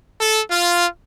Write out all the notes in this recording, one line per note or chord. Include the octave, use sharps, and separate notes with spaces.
A4
F4